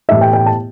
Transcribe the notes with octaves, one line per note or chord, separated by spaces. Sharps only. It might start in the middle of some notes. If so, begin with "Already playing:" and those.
A2 E3 A3 E4 G4 E5
G5
G5
A5